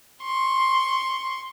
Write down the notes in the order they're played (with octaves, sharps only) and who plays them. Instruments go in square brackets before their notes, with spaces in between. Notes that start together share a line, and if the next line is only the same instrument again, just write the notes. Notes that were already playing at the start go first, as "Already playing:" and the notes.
[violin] C6 C#6